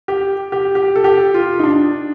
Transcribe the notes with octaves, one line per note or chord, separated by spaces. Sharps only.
G4
G4
G4
A4
G4
F4
D#4
D4